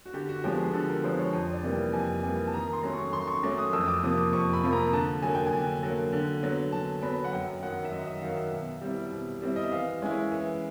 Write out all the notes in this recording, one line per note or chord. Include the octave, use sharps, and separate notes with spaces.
F#4
D3 G4
F#4
F3 G#3 B3 G4
G#4
D3 A4
A#4
F3 G#3 B3 C5
C#5
F2
D5
C3 E3 G3 A#3
G5
F2 G#5
C3 E3 G3 A#3 G#5
A5
D#3 A#5
C6
F#3 A3 C#4
C#6
D#3 C6
C#6
F#3 A3 C#4 D6
D#6
F2 E6
D#6
D6
C3 F3 A#3 D#6
D6
F2 C#6
B5
C3 F3 A#3
A#5
D3 A5
F#3 A#3 G#5
G5
G#5
D3
F#3 A#3
D3
F#3 B3
D3 A5
F#3 B3 B5
F#5
F#2 G5
D#3 F#3 F#5
E5
F#2 D#5
E5
D#3 F#3 F5
E5
B2
G3 C4 E4
B2
G3 C4 E4
D#5
E5
E3 F5
G#3 C#4 E4
E3